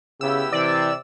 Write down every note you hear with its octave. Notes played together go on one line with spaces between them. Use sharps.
C#3 B3 E4 G4 E6
C3 E3 D5